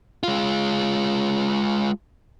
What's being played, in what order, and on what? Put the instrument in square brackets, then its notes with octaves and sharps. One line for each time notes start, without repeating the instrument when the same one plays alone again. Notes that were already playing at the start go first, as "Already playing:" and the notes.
[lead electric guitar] G#3 F4